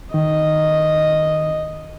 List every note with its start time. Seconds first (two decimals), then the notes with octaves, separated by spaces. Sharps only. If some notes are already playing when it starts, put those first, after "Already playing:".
0.14 D#3 D#5